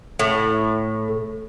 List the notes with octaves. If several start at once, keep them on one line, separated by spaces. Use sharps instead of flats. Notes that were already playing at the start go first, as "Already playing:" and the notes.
A2